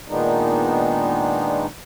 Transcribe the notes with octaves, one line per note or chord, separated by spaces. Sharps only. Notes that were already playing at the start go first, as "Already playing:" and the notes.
A#2 D#3 G#3 B3 D4 D#4